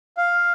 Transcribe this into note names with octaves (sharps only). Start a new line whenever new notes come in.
F5